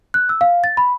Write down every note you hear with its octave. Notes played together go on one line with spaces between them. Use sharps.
F#6
E6
F5
A6
B5